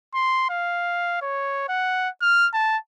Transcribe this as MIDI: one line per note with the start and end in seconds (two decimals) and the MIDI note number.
0.14 0.46 84
0.49 1.17 77
1.22 1.66 73
1.69 2.09 78
2.22 2.48 89
2.53 2.77 81